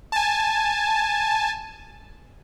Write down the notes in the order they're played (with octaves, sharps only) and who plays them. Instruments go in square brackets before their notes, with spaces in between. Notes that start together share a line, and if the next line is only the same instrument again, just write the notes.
[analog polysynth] G#5 A5